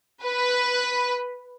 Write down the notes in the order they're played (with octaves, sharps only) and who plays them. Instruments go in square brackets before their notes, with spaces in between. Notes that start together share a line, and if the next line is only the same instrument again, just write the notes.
[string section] B4